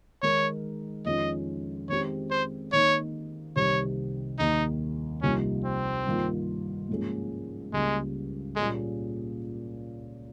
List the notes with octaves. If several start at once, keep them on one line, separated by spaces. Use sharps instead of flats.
D#3 G#3 D#4 A#4 C#5
F2 D#3 G#3 C#4 F4 D#5
D#3 G#3 C4 G4 C#5
C5
D#3 A#3 D#4 C#5
C2 C3 D#3 G3 C4 C#5
D#2 D#3 A#3 D#4
C2 C3 F3 A#3 C#4 D#4
C4
G2 D#3 A#3 F4
G#2 F3 A#3 C#4 G#4
C#2 C#3 G3 G#3 A#3
A#2 G3 G#3 A#3 C#4 G#4